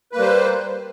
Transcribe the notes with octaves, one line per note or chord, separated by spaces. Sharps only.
G3 A#3 B4 C5